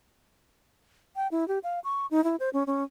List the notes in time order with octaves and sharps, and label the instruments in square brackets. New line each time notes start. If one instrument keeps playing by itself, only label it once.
[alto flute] G5
E4
G4
F5
C#6
D#4
E4
C5
C#4
C#4